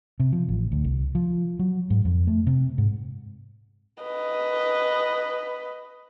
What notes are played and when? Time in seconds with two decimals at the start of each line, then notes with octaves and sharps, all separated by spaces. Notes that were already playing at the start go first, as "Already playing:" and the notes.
0.20 C3
0.32 F3
0.48 A1
0.72 D2
0.85 C2
1.15 F3
1.59 F#3
1.90 G#2
2.05 F2
2.27 A3
2.47 C3
2.78 G#2
4.03 B4 D#5